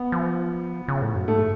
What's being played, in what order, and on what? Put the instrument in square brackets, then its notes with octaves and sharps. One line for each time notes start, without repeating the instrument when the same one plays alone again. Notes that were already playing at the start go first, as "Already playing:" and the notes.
Already playing: [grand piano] B3
[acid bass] F3
C#3
A2
F#2
[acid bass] G#2 [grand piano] A3